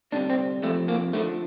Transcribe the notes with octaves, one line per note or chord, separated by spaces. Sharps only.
D2 C3 G3 D4
C4
F2 C3 F3 A3
A#3
D2 D3 F3 A3